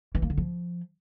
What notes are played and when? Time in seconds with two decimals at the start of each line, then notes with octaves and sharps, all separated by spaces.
0.15 E3
0.22 A#3
0.30 D3
0.38 F3